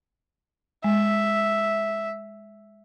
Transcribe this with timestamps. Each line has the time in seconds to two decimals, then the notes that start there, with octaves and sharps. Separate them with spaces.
0.84 G#3 E5